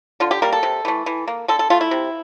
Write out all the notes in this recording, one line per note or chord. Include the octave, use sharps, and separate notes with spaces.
D3 F4
G4
G3 A#3 A#4
A4
C3
E3 A3
E3
A#3
D3 A4
A4
A3 F4
E4
C3